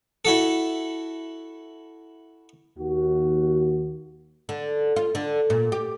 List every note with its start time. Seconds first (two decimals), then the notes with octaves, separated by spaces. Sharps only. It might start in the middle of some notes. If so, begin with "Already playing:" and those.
0.25 E4 F#4 A4
2.78 D#2 F#4
4.49 D3
4.96 F4
5.15 D3
5.50 A#2
5.72 G4